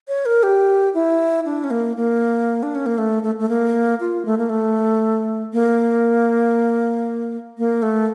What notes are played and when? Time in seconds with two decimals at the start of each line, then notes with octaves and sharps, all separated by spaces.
0.08 C#5
0.26 A#4
0.43 G4
0.94 E4
1.45 D4
1.64 C#4
1.71 A#3
1.97 A#3
2.63 D4
2.75 C#4
2.86 A#3
2.98 A3
3.23 A3
3.39 A3
3.49 A#3
4.00 F4
4.25 A3
4.38 A#3
4.50 A3
5.53 A#3
7.58 A#3
7.82 A3